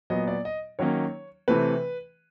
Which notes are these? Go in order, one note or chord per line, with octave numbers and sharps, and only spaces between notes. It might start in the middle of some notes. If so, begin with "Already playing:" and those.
A#2 F#3 B3 D#5
D5
D#5
D#3 F#3 A#3 C#4 C#5
C3 E3 A3 C4 B4